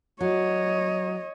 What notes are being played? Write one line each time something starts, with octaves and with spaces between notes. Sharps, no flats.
F#3 C#5 D#5